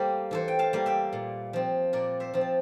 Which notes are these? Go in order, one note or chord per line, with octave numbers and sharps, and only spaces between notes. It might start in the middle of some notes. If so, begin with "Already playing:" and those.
Already playing: G3 A#3 A4 C5
E3 A4 C5
G5
F5 A5
G3 A#3
E5 G5
A#2
F3 C4
A#2 A#4 D5
C5 E5
F3 C4
A5